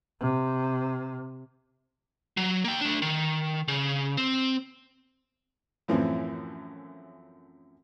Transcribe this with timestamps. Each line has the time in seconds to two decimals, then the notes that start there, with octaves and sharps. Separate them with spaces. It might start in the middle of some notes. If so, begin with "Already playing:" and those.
0.21 C3
2.37 F#3
2.64 A#3 G5
2.81 A3 D4
3.02 D#3
3.68 C#3
4.17 C4
5.88 F#2 A2 E3 F3 C4